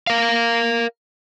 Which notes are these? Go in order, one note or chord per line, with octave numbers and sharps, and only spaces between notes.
A#4 F5